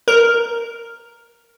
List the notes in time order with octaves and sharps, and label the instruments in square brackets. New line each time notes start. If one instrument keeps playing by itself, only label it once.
[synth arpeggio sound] A#4